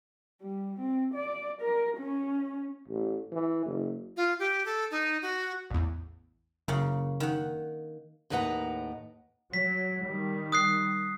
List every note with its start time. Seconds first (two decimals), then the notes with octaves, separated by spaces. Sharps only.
0.42 G3
0.80 C4
1.14 D5
1.62 A#4
1.97 C#4
2.88 A1
3.32 E3
3.66 F#1
4.17 F4
4.39 G4
4.66 A4
4.91 D#4
5.22 F#4
5.70 A1 E2
6.68 F#1 C#3 A#3
7.20 D#3 F#5
8.30 D#2 A2 D#4 B4 F#5 A#5
9.53 F#3 B6
10.06 D#3 G3
10.52 D#6 F#6 C7